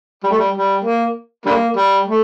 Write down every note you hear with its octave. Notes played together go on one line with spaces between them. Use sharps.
G3
A3
G3
G3
A#3
D3 G3 A#3
G3
A3